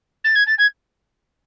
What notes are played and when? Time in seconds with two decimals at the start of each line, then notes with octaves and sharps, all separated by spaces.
0.24 A6
0.36 G#6
0.47 A6
0.58 G#6